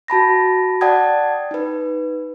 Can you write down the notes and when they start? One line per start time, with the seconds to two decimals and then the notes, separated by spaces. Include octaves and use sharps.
0.08 F#4 A5 B5 A#6
0.81 D5 F#5 G5 A5 D#6 G#6
1.51 D#4 B4